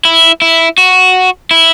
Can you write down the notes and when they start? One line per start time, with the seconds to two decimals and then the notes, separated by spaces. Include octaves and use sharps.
0.05 E4
0.42 E4
0.78 F#4
1.51 E4